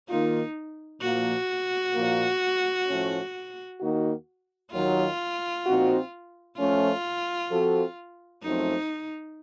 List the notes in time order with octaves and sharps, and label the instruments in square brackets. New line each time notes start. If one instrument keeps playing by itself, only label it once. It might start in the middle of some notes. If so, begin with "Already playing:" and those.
[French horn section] D#3 A#3 F4 [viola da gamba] D#4
[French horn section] A#2 F3 A#3 [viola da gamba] F#4
[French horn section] A#2 F3 A#3
A2 F3 A3 C#4
D#2 D#3 A#3 D#4 F#4
[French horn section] D#2 D#3 F#3 [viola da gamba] F4
[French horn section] A#2 F3 C4 D#4 F#4
[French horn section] F3 A3 C#4 [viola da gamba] F4
[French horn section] F3 C4 F#4 A4
[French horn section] F#2 F3 A3 C4 [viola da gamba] D#4